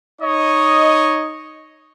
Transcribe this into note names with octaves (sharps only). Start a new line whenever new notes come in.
D#4 C#5 D#5